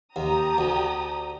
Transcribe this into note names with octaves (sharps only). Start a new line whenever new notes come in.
D#2 G4 A#5 D#6
D2